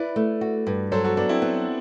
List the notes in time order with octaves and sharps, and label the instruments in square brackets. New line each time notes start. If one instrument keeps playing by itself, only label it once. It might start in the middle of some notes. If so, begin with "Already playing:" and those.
Already playing: [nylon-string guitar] E4 [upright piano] B4 D5
[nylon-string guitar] A3
F#4
G2
[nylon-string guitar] F#3 [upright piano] A4 C5
[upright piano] F#4 A4
[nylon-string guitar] F#3 [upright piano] B3 D4
[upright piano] C4 E4
[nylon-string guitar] B3